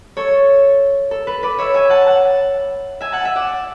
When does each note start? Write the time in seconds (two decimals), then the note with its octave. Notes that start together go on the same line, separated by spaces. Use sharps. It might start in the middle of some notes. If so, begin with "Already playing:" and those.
0.17 A4 C#5
1.11 A4
1.27 B4
1.43 B4 D5
1.58 C#5 E5
1.74 E5 G#5
1.90 F#5 A5
2.06 F#5 A5
3.01 E5 G#5
3.12 F#5 A5
3.24 E5 G#5
3.36 D5 F#5